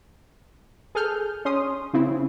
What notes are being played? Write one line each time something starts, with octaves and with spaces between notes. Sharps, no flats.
G#4 A4 F6 G6
C#4 C6 D#6
C#3 C4 E4